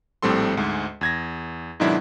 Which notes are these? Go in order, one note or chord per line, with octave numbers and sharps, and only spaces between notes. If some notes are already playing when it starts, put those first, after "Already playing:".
A#1 A2 G3 C4 A4 C6
D2 G#2 G#3
E2 G#6 A#6
G#2 B2 D#3 F#3 D4 E4